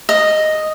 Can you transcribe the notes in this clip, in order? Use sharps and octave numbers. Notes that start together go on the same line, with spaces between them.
D#5